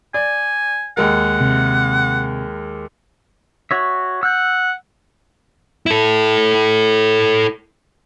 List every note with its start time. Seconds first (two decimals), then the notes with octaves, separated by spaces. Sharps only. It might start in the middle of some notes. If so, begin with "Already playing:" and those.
0.14 D5 G#5
0.97 D#2 G#3 A#4 F#5
1.40 C3
3.71 F#4 C#5 E5
4.23 F#5 E6 G6
5.86 E4 A4